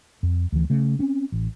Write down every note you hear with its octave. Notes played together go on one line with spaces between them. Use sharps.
F2
D2 E3
C#3 A3
C4 C#4
A1